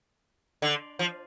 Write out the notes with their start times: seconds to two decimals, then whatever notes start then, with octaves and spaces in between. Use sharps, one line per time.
0.62 D3
0.99 F3